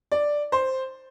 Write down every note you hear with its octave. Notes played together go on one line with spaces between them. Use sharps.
D5
C5